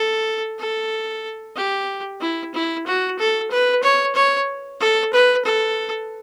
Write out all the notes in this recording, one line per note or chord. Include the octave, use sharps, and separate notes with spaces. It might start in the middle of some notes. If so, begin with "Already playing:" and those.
Already playing: A4
A4
G4
E4
E4
F#4
A4
B4
C#5
C#5
A4
B4
A4